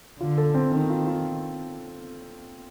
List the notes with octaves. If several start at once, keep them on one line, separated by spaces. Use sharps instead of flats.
D3 F4
A4
C4
D#3 C4
F4
F4